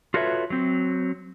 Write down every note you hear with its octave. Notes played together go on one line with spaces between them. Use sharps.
F4 F#4 A4 B4 C#5 E5
F#3 C4